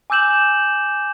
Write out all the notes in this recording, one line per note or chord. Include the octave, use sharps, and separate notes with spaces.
G#5 D6 E6 G6 E7 F#7